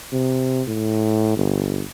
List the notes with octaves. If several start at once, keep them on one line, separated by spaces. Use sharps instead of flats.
C3
A2
G1